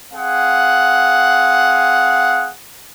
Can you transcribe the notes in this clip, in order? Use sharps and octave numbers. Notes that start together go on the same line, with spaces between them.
C4 G#4 F5 F#5